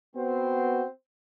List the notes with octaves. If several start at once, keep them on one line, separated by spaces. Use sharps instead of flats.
B3 C4 F#4 C5